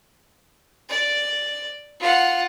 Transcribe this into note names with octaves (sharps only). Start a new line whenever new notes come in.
D5
F4 F#5